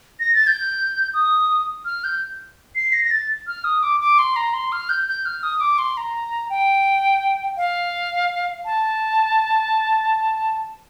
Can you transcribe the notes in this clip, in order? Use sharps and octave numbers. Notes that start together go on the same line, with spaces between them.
A#6
A6
G6
D#6
F6
G6
C7
A#6
A#6
A6
F6
D#6
D6
D6
C6
A#5
C6
F6
G6
G6
F6
D#6
D6
C6
A#5
G5
F5
A5